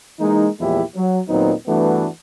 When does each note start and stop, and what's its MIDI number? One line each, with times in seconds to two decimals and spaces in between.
0.19 0.47 52
0.19 0.47 56
0.19 0.47 58
0.19 0.47 63
0.60 0.81 40
0.60 0.81 46
0.60 0.81 53
0.60 0.81 56
0.60 0.81 64
0.60 0.81 67
0.95 1.20 54
1.28 1.52 39
1.28 1.52 46
1.28 1.52 54
1.28 1.52 59
1.28 1.52 60
1.28 1.52 63
1.67 2.06 43
1.67 2.06 52
1.67 2.06 57
1.67 2.06 59
1.67 2.06 62
1.67 2.06 66